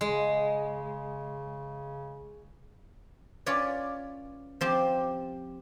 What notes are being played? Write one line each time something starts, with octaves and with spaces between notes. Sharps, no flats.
C#3 G#3
C#4 F4 B4 C#5 D5
F3 C4 G4